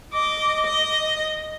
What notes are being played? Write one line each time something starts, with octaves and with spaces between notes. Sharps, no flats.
D#5 D6
D#5